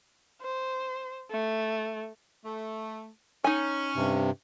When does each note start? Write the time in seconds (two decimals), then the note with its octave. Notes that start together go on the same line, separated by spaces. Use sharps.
0.41 C5
1.31 A3
2.45 A3
3.44 C#4 D#4 G#5
3.96 G2 C3